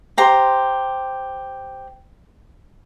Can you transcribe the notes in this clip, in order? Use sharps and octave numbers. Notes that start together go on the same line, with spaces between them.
G4 C5 A#5